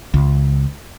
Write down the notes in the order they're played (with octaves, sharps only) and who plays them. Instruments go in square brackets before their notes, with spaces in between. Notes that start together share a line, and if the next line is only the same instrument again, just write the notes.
[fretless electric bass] C#2